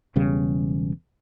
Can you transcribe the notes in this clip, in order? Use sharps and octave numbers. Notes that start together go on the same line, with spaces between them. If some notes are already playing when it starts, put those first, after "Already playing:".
E1 E2 C#3 G3